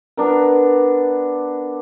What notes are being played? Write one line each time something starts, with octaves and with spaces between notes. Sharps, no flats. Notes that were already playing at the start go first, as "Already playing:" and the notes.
B3 D4 A#4